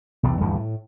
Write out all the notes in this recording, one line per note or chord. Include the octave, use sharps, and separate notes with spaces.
B1 E2 C3
D1 D2 G2 E3
A2